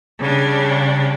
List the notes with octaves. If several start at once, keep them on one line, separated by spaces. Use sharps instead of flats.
C#3 G3 D4